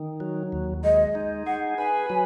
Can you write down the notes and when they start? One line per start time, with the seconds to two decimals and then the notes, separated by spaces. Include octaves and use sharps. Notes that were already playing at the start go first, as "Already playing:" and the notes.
Already playing: D#3
0.20 F#3
0.52 D#2
0.84 G#3 D#5
1.15 D#4
1.47 G#4 F#5
1.78 B4 G#5
2.10 F#3